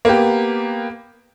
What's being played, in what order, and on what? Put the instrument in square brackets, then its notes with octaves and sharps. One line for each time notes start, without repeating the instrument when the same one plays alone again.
[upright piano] A#3 B3 G4